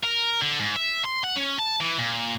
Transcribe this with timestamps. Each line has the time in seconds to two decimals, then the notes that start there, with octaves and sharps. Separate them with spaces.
0.03 A#4
0.42 D3
0.60 G#2
0.76 E5
1.05 C6
1.24 F#5
1.37 C#4
1.59 A5
1.81 E3
1.99 A#2